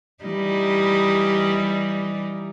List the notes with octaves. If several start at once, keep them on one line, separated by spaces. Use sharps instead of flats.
E3 G3 D#4